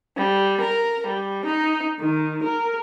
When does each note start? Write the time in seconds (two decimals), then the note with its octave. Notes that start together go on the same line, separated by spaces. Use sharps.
0.17 G3
0.62 A#4
1.07 G3
1.47 D#4
2.00 D#3
2.43 A#4